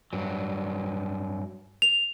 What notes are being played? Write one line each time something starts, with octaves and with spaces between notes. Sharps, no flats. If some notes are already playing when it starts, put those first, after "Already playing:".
G2 F#3
F7